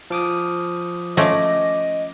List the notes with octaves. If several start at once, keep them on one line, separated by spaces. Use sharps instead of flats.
F3 D6 D#6
F3 A3 C#4 D#5 D6 A#6